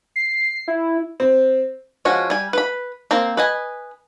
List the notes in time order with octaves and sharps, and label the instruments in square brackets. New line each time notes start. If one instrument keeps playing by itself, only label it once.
[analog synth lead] C7
E4
[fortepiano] C4
[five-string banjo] F3 G#3 C#4 F#4
G3 G#5
B4 B5
A#3 C4 A#5
B4 D#5 G#5